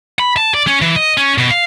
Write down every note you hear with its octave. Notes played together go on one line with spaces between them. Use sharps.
B5
A5
D5
C#4
E3
D#5
C#4
B2
F5